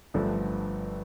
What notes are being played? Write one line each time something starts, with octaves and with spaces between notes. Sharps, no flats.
G1 G2 D3 F3 A3